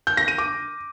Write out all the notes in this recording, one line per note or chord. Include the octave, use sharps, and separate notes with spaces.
G6
A#6
D#7
D6